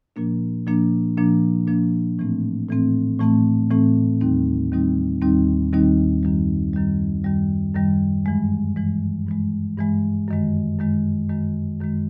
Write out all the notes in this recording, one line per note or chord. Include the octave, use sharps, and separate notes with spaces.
A#2 F3 A#3 D4
A#2 F3 A#3 D4
A#2 F3 A#3 D4
A#2 F3 A#3 D4
A2 E3 A3 C4
A2 E3 A3 C4
A2 E3 A3 C4
A2 E3 A3 C4
D#2 D#3 G3 C4 D#4
D#2 D#3 G3 C4 D#4
D#2 D#3 G3 C4 D#4
D#2 D#3 G3 C4 D#4
F#2 D#3 G3
F#2 D#3 G3
F#2 D#3 G3
F#2 D#3 G3
G2 E3 G#3
G2 E3 G#3
G2 E3 G#3
G2 E3 G#3
F#2 D#3 G#3
F#2 D#3 G#3
F#2 D#3 G#3
F#2 D#3 G#3